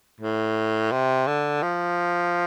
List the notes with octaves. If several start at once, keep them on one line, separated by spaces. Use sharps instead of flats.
A2
C3
D3
F3